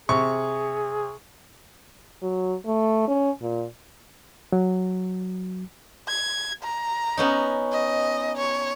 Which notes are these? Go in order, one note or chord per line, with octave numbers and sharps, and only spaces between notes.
C3 G#4 C#6
F#3
A3
C#4
A#2
F#3
G#6
A#5
B3 C#4 D#4
D#5
C#5